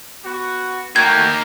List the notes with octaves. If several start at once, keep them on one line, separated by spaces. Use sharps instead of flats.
B3 F#4
A3 A#3 D#4 F#4 G5 G#6